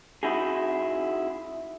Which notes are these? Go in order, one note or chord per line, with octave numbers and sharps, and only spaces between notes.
D#4 E4 F#4 G#4